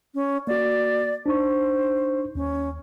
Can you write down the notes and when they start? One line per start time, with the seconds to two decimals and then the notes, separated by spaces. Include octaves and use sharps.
0.14 C#4
0.47 A#3 F#4 D5
1.26 D4 D#4 C5 C#6
2.35 D#2 C#4